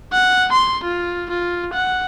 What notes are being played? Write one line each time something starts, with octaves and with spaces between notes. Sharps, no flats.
F#5
C6
F4
F4
F#5